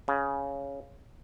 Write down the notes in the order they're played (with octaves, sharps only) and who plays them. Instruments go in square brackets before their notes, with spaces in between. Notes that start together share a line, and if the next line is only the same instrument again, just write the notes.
[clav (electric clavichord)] C#3